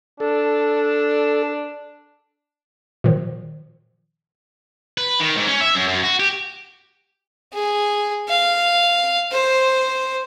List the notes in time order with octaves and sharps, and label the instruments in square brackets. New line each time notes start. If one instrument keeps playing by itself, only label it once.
[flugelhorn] D4 [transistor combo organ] A4
[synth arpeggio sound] A#2 D#3 F3
[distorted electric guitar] B4
D#3
G#2
C#4
E5
F#2
F#2
F#4
G4
[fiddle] G#4
F5
C5